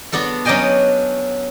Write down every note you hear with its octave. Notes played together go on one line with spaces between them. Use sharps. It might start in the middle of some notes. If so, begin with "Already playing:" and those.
B3 D4 F#4 A4
F#3 C#4 D4 D#5 G5 G#5